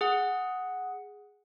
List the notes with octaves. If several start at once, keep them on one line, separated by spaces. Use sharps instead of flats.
G#4 F#5